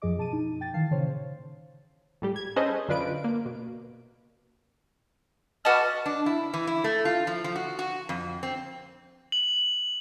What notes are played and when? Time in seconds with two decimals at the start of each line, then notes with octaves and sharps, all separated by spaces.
0.02 F#2 F3 G#4 D#5 D6
0.18 B2 A5 D6 D#7
0.33 D#4
0.61 G5 A6
0.74 D#3 E3 F5 A5 C7
0.91 A#2 C#3 C5 C#5 F5
2.22 A2 G3 G4
2.36 G#6
2.56 C#4 G#4 A4 B4 C5 D#5
2.88 F#2 D3 D4 F4 B4 D7
3.24 A#3
3.46 B2
5.65 F#4 B4 D#5 A5 D6 F6
6.06 D4
6.26 E4
6.54 E3
6.67 E4
6.84 A3
7.05 F4
7.27 F3
7.44 F3
7.56 F#4
7.79 F#4
8.09 F2
8.43 C4
9.32 F#7